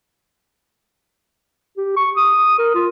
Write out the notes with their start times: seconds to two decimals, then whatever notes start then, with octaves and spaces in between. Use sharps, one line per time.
1.77 G4
1.96 C#6
2.16 D#6
2.59 A#4
2.75 F4